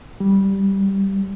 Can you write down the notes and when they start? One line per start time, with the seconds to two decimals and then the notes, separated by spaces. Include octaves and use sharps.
0.20 G3